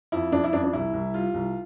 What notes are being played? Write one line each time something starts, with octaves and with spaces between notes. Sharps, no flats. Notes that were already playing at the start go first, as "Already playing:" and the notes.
F2 E4
F2 D4
E4
F2 D4
D4
C2 E4
C2
G3 F4
C2